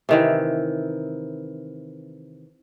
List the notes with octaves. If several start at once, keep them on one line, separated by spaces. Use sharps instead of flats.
C3 D#3 E3